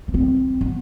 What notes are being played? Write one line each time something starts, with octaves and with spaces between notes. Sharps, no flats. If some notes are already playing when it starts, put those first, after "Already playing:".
B3
C4
B3